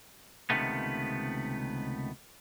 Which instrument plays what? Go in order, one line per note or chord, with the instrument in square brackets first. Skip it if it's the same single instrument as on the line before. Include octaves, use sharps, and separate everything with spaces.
[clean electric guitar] C#2 C3 D#3 A3 B3